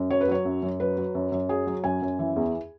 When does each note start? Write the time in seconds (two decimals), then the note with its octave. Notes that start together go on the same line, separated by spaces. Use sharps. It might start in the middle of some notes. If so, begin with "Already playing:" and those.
Already playing: F#2
0.10 F#3 C#5
0.21 B4
0.28 F#3 C#5
0.45 F#2
0.63 F#2
0.80 F#3 B4
0.97 F#3
1.15 F#2
1.32 F#2
1.49 F#3 G#4
1.66 F#3
1.84 F#2 G#5
2.02 F#2
2.19 E3
2.36 E2